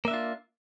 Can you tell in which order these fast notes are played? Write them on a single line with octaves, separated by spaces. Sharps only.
A#3 E5 D4 F4